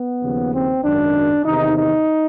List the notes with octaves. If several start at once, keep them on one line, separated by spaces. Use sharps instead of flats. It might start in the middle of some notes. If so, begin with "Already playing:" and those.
Already playing: B3
D#2 C#3 F3
C4
G#1 F#2 D#3 F#3 D4
E2 C3 D#3 D#4
D#4